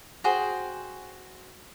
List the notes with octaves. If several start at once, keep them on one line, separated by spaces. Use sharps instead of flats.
F#4 G#4 C5 G5